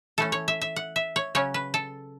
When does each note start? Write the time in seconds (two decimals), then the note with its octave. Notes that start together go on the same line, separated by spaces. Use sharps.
0.18 E3 A3 C#4 A4
0.32 C#5
0.48 E5
0.61 E5
0.76 F#5
0.96 E5
1.16 C#5
1.35 C#3 F#3 C#4 C#5
1.54 B4
1.74 A4